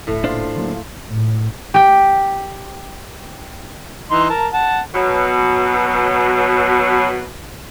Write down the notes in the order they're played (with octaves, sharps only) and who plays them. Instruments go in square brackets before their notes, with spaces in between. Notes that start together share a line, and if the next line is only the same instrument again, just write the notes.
[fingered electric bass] D1 G1 [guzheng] A2 A3
[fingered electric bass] F#1 A#2 [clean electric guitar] D4 C5 [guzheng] F4
[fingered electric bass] D3 F#3 A#3
[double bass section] A2
[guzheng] G4 G5
[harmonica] E3 D#4 C6
A#4 A5
F#5 A5
[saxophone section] B2 F#3